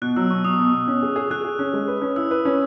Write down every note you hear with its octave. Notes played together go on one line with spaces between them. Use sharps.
B2 F#6
F#3 E6
B2 C#6
B2 D#6
B2
B2
C#4
G#4
G#4
G#4 F#6
G#4
C#4
G#3
B4
C#4
E4 E6
B4
C#4